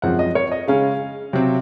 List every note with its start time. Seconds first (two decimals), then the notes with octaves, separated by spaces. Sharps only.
0.02 F#2 F3 G#3 C4 F#5
0.19 D#5
0.35 C#5
0.52 D#5
0.68 C#3 G#3 C#4 F5
1.33 C3 F#3 C4